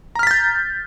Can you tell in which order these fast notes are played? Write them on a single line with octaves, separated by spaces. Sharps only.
A#5 F6 B6 A6 G6